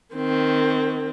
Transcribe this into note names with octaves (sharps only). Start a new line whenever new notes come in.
D#3 C4